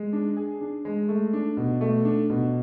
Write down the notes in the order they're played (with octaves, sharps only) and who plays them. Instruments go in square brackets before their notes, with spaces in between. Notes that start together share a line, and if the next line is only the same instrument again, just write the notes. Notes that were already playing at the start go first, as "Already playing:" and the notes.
Already playing: [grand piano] G#3
D4
G#4
D4
G#3
A3
D4
B2
A3
D4
B2